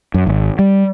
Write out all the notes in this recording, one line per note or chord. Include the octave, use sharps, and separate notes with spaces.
F#2
G#1
G3